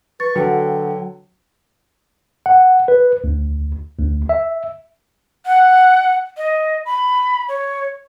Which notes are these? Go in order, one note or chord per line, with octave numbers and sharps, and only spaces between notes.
B4 C#6 A6
D3 F#3 B4 F#5 G5
F#5
B4
D2
D2
E5
F#5
D#5
B5
C#5